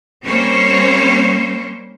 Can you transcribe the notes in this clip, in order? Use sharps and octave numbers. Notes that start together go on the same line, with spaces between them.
G3 A#3 C4 C#4 C5 C#5